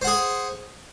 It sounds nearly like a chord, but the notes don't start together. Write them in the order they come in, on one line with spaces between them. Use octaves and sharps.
C5 F#5 G#4